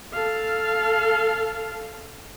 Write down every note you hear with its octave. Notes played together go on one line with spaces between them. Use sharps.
A4 F5